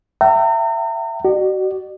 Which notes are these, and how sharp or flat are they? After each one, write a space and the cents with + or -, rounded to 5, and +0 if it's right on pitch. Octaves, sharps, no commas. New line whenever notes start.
E5 +20 G5 -35 A#5 -40
F#4 +35 D5 +45